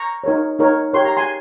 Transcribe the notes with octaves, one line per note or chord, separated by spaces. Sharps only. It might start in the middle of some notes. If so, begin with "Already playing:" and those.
Already playing: A#5 C#6
D#4 A#4 C#5
D#4 A#4 C#5
G4 A#4 C#5 C6
A#5
G#5 C6